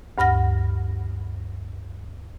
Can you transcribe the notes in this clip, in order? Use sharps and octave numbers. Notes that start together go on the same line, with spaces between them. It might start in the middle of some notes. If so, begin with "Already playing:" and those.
D2 G2 F#5 F6 A#6